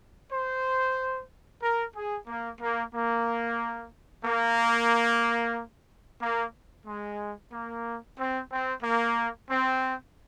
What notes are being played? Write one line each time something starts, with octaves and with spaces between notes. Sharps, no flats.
C5
A#4
G#4
A#3
A#3
A#3
A#3
A#3
G#3
A#3
C4
C4
A#3
C4